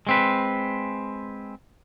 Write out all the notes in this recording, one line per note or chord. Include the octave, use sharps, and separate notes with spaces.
G#3 C4 B4